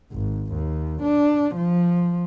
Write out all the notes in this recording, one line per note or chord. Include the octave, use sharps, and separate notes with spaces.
G#1
D#2
D4
F3